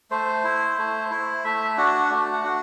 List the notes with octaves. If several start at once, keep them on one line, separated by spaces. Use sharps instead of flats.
A3 C5
E4
A3
E4
A3 E5
D4 F#4 F#5
A3
F#5
D4 F#4